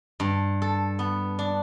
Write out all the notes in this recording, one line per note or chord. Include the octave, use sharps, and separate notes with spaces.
G2
A4
B3
D4